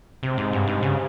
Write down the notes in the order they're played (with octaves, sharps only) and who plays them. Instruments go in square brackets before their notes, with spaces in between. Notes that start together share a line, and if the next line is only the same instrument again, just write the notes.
[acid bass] C3 [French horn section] G#3 C4 G4
[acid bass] G#2
G2
G#2
C#3